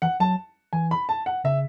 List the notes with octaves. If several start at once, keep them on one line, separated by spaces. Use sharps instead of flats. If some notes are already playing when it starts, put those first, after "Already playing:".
E3 F#5
F#3 A5
E3 G#5
B5
A5
F#5
C#3 E5